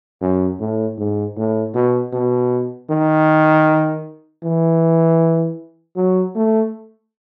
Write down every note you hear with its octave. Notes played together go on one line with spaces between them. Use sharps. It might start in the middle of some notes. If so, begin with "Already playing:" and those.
F#2
A2
G#2
A2
B2
B2
D#3
E3
F#3
A3